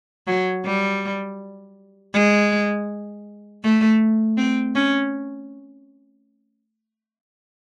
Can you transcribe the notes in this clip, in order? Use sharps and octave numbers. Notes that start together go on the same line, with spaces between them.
F#3
G3
G#3
A3
C4
C#4